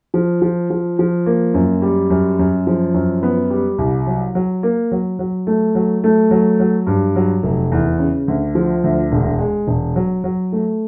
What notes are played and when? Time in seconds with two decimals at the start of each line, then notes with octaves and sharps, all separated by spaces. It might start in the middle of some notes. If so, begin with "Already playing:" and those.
0.14 F3
0.42 F3
0.70 F3
0.99 F3
1.26 A#3
1.54 F#2
1.82 G3
2.10 F#2
2.39 F#2
2.67 F3
2.94 F#2
3.23 B3
3.50 G3
3.78 C2
4.07 F#3
4.35 F#3
4.63 A#3
4.92 F#3
5.19 F#3
5.47 A3
5.75 F#3
6.04 A3
6.31 F#3
6.60 F#3
6.87 G2
7.16 F#3
7.43 F1
7.72 E2
7.99 C#3
8.28 D2
8.55 F3
8.84 D2
9.12 E1
9.39 G#3
9.67 E1
9.96 F#3
10.24 F#3
10.52 A3